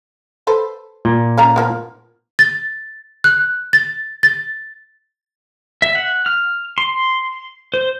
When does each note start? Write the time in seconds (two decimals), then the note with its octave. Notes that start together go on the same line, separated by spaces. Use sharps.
0.47 A4 B4 C5
1.05 A#2
1.38 C#4 F5 A#5
1.56 F3 A#3 B3
2.39 A6
3.24 F#6
3.73 A6
4.23 A6
5.82 E5
5.95 F#5
6.26 F6
6.78 C6
7.74 C5